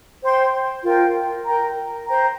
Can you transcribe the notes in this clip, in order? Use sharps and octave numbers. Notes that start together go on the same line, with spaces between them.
C5 G5 C6
F4 A#4 G5
A#4 G5 A#5
C5 G5 A#5